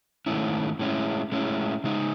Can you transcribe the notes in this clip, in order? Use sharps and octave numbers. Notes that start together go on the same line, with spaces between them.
G#2 D#3 A3 C#4 E4
A2 G#3 C#4 E4
A2 G#3 C#4 E4
C#3 G#3 D#4